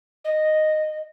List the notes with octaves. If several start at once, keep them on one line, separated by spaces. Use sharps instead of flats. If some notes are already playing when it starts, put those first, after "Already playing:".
D#5